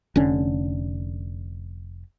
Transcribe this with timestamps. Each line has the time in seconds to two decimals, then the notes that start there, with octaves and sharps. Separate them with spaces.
0.16 F1 D3 C#4